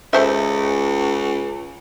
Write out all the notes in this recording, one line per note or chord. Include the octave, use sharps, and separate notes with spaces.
C#2 A4 C5 E5